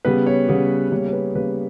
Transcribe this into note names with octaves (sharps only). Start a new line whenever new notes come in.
C#3 G3 B3 B4
C#5
C#3 G3 B3
C#3 G3 A#3 C#5
C#5
B4
C#3 G3 A#3 B4